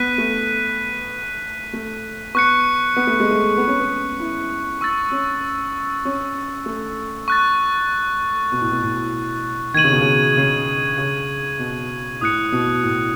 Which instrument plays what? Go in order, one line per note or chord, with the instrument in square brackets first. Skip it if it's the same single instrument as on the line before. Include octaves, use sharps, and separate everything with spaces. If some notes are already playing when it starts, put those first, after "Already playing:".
Already playing: [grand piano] B3 [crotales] F#6 B6 D#7
[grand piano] A3
A3
[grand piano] B3 [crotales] C#6 F#6 C#7
[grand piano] B3
A3
G#3
A3
B3
C#4
B3
E4
[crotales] C#6 E6 A6
[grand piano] C#4
C#4
A3
[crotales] C#6 F#6 A6
[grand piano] B2
A2
B2
A2
[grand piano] D#3 [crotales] G#6 D#7 F#7
[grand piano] C#3
B2
C#3
C#3
C#3
B2
[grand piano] A2 [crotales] D#6 F#6 C#7
[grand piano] B2
A2